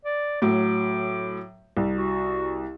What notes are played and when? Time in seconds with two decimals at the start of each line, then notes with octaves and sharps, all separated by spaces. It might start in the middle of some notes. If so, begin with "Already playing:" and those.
0.05 D5
0.42 A2 F#3 D6
1.77 C2
1.97 F#4